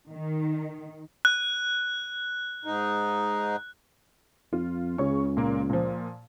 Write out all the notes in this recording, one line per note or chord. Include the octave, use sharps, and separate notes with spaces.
D#3
F#6
G#2 D#4
F2 F4
C#2 C#3 C#5 C#6
A#2 A#3
A#2 F3